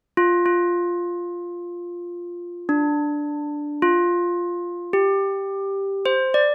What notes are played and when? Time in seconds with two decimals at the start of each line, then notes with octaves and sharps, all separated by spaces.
0.17 F4
0.46 F4
2.69 D4
3.82 F4
4.93 G4
6.06 C5
6.34 D5